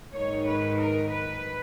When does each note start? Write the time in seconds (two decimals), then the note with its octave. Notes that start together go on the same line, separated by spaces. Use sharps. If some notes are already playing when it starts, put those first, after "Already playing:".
0.14 G#2 D#3 G#3 D#4 C#5
0.46 B4
0.78 A#4
1.10 B4